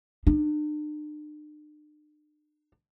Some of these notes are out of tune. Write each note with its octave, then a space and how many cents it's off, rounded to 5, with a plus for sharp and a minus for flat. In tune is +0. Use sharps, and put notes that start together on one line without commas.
D4 +45